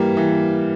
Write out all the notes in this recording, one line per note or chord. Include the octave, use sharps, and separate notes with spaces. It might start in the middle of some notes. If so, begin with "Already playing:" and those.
Already playing: E3 G3 A#3
E3